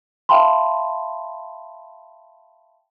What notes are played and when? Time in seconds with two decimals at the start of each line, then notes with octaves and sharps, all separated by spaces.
0.29 E5 F5 G5 A5 B5 C6